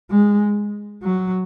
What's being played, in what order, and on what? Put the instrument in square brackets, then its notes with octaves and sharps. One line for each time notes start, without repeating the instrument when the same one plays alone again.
[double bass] G#3
F#3